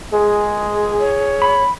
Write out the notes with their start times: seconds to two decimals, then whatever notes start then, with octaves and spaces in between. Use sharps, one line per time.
0.13 G#3 G#4
1.00 C#5
1.42 B5